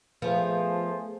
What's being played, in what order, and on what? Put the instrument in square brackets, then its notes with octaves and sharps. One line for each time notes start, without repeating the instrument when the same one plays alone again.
[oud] F3 B3 [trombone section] A3 G#4 C5